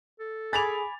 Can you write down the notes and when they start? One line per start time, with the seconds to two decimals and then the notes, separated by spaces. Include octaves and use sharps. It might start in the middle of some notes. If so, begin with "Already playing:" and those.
0.20 A4
0.53 G#4 G#5 B5 D6 A6 F7